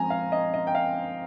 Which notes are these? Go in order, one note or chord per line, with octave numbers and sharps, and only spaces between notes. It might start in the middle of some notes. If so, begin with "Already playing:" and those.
Already playing: F3 G#3 C4 G#5 A#5
F5
D#5
D#5
G5
F5